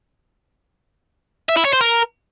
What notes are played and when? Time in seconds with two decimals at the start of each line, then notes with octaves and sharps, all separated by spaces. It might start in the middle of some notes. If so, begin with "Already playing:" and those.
1.49 E5
1.57 E4
1.65 C#5
1.73 C5
1.81 A#4